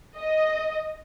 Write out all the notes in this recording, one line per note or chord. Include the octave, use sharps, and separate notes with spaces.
D#5